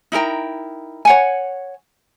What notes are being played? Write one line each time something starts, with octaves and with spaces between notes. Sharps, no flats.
D#4 E4 A#4 G5
C#5 F#5 G#5